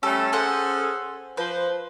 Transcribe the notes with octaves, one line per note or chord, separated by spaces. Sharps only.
G3 A3 C#4 A4
C#4 G#4 A4 C5 F#5
F3 B4 C5